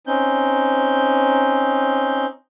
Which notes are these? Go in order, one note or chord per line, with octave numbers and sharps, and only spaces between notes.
C4 C#4 D#4 G6